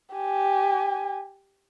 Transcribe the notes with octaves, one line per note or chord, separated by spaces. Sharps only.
G4 G#5